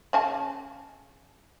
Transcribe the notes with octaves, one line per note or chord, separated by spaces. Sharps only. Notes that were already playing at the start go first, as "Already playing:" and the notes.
C#3 G#5 A5